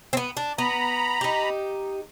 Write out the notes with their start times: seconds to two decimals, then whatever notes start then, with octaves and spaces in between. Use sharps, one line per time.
0.13 B3 C4
0.37 D4
0.58 B3 A#5 B5
1.21 D#4 G4